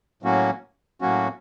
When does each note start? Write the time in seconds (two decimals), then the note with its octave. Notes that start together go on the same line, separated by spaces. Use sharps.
0.23 A2 F#3 A#3 C#4 F#4
1.01 A2 F#3 A#3 C#4 F#4